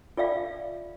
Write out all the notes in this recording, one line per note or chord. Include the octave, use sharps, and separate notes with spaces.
F4 D5 E5 F5